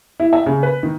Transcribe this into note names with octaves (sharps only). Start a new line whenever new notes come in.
E4
E5
C#3
B4
D#3